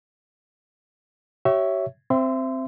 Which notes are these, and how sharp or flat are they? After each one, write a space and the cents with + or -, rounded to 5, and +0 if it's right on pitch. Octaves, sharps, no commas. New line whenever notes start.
G4 -45 C#5 +0 E5 +0
C4 +0 E5 +25 C6 -25